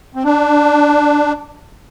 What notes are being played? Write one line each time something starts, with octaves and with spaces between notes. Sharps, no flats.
C4
D4